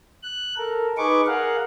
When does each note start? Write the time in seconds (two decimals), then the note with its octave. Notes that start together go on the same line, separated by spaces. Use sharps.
0.23 F#6
0.57 A4 A#4
0.98 D#4 G#4 B4 C#6 D6
1.26 G#4 A#4 F5 F#5